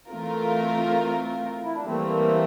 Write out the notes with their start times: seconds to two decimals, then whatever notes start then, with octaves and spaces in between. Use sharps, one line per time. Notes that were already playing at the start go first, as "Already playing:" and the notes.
0.10 E3 A3 C4 F4 A#4
1.63 E4
1.74 D4
1.84 E3 G3 A3 A#3 C4